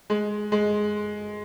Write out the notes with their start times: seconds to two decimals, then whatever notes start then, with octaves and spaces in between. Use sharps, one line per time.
0.10 G#3
0.52 G#3